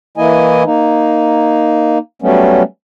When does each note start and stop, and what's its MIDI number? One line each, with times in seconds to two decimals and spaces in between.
0.18 0.64 52
0.18 0.64 58
0.18 0.64 64
0.18 0.64 75
0.18 0.64 80
0.65 1.98 58
0.65 1.98 63
2.22 2.63 54
2.22 2.63 55
2.22 2.63 57
2.22 2.63 59
2.22 2.63 61